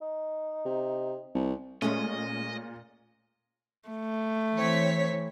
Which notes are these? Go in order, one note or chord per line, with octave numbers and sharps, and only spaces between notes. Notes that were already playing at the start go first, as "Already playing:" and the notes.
D#4
C3
C2
A#2 G#3 A3 C#4 D#5
A3
E3 C4 C#5 B6